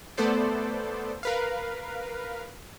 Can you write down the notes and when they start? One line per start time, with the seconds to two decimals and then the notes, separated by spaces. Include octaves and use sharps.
0.17 A3 B3 A4 C5 D5
1.23 A#4 B4 F5